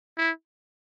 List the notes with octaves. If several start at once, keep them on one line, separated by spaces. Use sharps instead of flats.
E4